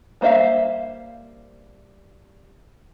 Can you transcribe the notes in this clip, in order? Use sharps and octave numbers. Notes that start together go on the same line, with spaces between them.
G3 A#3 C5 E5 F5